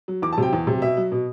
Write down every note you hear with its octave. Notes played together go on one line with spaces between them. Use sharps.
F#3
E2 D6
A5
C3 F#3 G5
E2
C3 F#3
B2 E5
F#3
B2